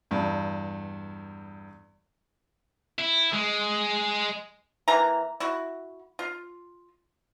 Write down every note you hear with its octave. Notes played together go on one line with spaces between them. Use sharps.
E2 G2
E4
G#3
E3 A#3 A#5
E4 F#4
F4